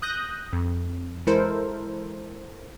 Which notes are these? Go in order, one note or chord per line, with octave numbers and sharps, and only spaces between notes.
D#6 F#6 G6 A#6
F2
E3 G#3 E4 A4 A#4 C5